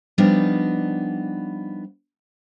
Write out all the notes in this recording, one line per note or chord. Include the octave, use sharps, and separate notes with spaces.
F3 G3 B3 D4 D#4